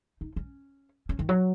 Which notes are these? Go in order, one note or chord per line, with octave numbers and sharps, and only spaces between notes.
D#4
C#4
C#4
D#3
F#3